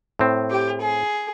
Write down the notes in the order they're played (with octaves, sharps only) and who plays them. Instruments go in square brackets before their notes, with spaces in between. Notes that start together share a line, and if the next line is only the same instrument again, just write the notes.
[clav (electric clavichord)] A2 C4
[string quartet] G4
G#4